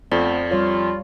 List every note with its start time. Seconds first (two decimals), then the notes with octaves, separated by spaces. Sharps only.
0.12 F2 F3 A3 B3 D5
0.51 G3 F4 C#5